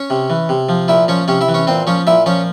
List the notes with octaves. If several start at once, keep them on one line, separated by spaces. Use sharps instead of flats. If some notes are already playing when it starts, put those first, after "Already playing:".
Already playing: C#4 C#5
C3
E3
C3
F3
A#2 E4 E5
F3 C#4 C#5
C3 C#4 C#5
E4 E5
E3
C#4 C#5
A#2 C4 C5
F3 C#4 C#5
A#2 E4 E5
F3 C#4 C#5